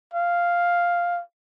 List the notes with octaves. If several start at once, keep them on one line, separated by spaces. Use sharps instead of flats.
F5